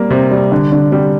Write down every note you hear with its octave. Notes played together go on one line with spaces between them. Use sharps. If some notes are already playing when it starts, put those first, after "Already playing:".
Already playing: G3 A#3
C3
G3
D3
D3
G3